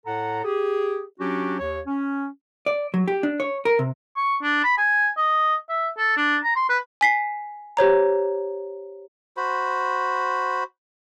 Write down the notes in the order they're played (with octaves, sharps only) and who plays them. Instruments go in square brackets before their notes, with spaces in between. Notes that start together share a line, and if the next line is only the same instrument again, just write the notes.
[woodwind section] A2 A4 F#5 A#5
G4 G#4
F#3 C#4 D4 F#4 G4
D#2 C#5
C#4
[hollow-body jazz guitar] D5
F#3
G4
D4
C#5
A#4
C3
[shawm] C#6
D4
B5
G#5
D#5
E5
A4
D4
A#5
C6
B4
[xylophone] G#5 B6 C7
G4 C5 C#5 A#5
[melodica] F#4 C5 B5